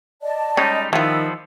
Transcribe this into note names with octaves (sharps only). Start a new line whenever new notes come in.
D5 D#5 A5
G3 G#3 C#4 D#4
D#3 F3 G3 B3 E4 F4 E6